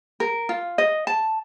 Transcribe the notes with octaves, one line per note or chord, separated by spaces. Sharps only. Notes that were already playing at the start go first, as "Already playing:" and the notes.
A#4
F4
D#5
A5